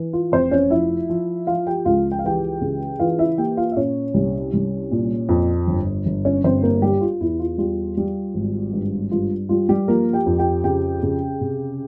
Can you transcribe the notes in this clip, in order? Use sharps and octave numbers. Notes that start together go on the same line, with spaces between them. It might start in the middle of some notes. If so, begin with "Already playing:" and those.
Already playing: E3
F4
F1 C4 C5
C#4 C#5
F3 E4 E5
F3
F3 F4 F5
G4 G5
C#2 F4 F5
G5
F5
E3 G4 G5
C#3
E3 F4 F5
E4 E5
A#3 G4 G5
F4 F5
E5
A#2 C#4 C#5
C2
C2
A#2
F2
G1
G1
C#4 C#5
G1 C4 C5
A#3 A#4
G3 G4
F4
E2 E4
F4
G3 F4
G3
G#1
G2
G2 F4
G3 F4
G3 G4
F3 A#3 A#4
G4 G5
F2
G4 G5
C#3 G4 G5
C#3
C3